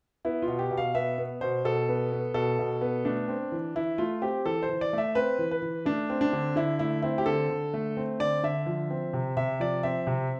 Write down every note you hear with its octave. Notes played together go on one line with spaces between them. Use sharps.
B3 E4
F4
B2
G4
B2
F5
B3 E5
B3
B2 C5
B2 A4
B3
B3
B2 A4
B2
B3
A3 D4
C4
E3
E3 E4
A3 F4
C4 G4
E3 A4
C5
E3
D5
A3 E5
C4 B4
E3
B4
E3
A3 D4
C4
D4
D3
D3 E4
A3 E4
C4 E4
G4
D3 A4
D3
A3
C4
D3 D5
D3 E5
F3
C4
C3
C3 E5
F3 D5
C4 E5
C3